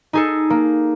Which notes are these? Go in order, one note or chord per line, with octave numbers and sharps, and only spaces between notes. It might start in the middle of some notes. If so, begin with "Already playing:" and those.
D#4 G#4 A4
A#3